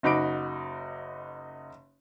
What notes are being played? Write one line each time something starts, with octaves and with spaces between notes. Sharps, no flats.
F#1 D#4 F#4 B5 D6 D7